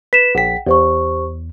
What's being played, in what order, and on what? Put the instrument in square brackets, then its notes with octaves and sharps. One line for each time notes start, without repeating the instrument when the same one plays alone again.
[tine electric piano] B4 [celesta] B6 E7
[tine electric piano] A#1 B6 [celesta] F#5 G5
[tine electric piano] E2 [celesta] G4 C5 C#6